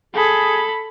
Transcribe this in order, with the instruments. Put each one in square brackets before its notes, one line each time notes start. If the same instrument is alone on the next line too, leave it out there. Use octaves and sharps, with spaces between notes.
[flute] G#4 [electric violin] A4 B5